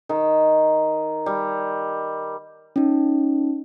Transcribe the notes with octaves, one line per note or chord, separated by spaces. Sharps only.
D#3
G3
C#4 D#4